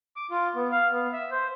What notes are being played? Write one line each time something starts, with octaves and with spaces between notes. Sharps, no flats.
D6
F4
B3
F5
B3
E5
C5